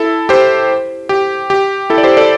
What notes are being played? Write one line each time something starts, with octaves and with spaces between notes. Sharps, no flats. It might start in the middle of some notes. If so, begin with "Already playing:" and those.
Already playing: E4 A4
G4 C5
G4
G4
E4 A4
D5
G4 C5
A4 D5